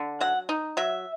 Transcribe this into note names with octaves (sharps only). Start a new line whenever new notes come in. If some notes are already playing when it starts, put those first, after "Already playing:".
Already playing: D3
F#3 F#5
D#4
F#3 E5